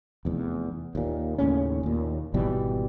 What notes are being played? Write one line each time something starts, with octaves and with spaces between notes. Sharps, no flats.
F1 E2
D#2 A#2
D#2 A2 C#3 C#4
D#2 A#2
G#1 B2 E3 G3